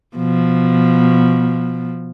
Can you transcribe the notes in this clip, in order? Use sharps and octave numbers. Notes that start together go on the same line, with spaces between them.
B2 F3